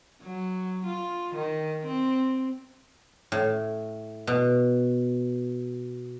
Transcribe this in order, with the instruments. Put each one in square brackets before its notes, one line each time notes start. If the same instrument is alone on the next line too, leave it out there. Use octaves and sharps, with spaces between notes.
[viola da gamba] F#3
F4
D#3
C4
[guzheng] A2
B2